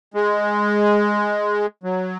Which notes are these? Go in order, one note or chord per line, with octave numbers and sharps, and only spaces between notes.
G#3
F#3